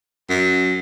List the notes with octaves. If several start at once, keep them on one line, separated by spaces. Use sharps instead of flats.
F#2